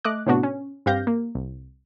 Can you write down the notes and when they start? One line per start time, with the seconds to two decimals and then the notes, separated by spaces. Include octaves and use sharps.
0.04 A3 D#5 D6 F#6
0.26 A2 C3 B3 D4 F#4
0.43 C#4
0.86 G2 C4 G4 F5 G6 A#6
1.07 A#3
1.35 C2